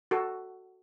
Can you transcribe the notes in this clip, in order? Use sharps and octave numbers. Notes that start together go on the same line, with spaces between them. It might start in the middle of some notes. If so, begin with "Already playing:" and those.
F#4 A4